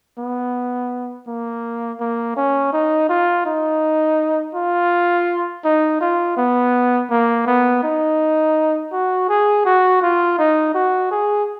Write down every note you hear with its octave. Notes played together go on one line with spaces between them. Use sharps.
B3
A#3
A#3
C#4
D#4
F4
D#4
F4
D#4
F4
B3
A#3
B3
D#4
F#4
G#4
F#4
F4
D#4
F#4
G#4